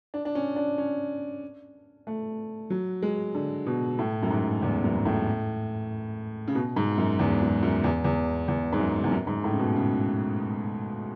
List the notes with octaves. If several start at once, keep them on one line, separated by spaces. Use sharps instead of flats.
D4
D4
C#4
D4
C#4
A3
F#3
G#3
D3
B2
A2
F#2
G#2
E2
F#2
G#2
A2
C#3
B2
G#2
F#2
E2
F#2
F#2
E2
E2
E2
G#2
F#2
E2
F#2
G#2
A2
C#3
B2
C#3